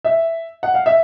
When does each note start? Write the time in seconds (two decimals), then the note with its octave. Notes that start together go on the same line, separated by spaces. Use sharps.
0.05 E5
0.63 F#5
0.74 F5
0.86 E5